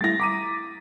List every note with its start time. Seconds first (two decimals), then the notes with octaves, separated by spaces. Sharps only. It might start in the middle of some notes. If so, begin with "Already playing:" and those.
0.01 G3 A3 E4 A6 A#6
0.20 A#5 D6 D#6 B6 D#7